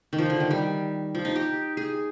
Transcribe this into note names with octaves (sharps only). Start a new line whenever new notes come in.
D#3
F3
D3
D#3
G3
F3
D#4
G4
G#4